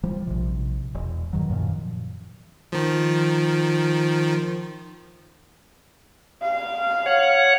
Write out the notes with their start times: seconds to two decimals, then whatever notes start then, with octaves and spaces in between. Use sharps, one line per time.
0.03 F3 G3
0.27 A#1 C3
0.95 E1
1.33 G2 D#3 F#3
1.49 F#2 A#2 D#3 F3
2.72 D#3 F3
6.42 F5
7.06 C#5 F#5